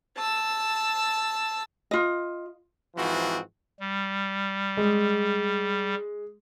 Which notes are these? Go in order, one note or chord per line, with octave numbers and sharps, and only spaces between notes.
A5 E6
F4 D#5
G#2 E3 F3 C4 F#4
G3
G#3